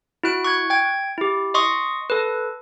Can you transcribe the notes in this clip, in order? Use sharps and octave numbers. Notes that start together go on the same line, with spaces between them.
E4 F#4 F#6 D7
C#6 F#6 G#6
G5 G#6
E4 G4
D#5 C6 C#6 D#6
A4 B4